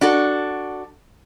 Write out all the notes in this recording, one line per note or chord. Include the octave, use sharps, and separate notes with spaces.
D4 F#4 A4